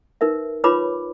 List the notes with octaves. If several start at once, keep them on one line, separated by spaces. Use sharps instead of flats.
D#4 A#4 B4 E5
D#4 F4 B4 C#5 B5 D6